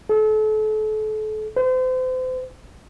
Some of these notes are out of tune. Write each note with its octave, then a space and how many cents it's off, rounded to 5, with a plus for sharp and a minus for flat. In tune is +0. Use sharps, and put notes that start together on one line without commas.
A4 -35
C5 -35